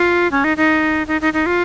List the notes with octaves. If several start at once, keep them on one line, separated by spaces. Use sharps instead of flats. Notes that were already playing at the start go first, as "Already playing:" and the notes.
Already playing: F4
C#4
D#4
D#4
D#4
D#4
D#4
F4